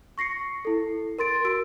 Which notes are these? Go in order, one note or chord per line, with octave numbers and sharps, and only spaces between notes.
C#6 A#6 C7 C#7
E4 A4
A#4 C6 A6 D7
F#4 E6 D7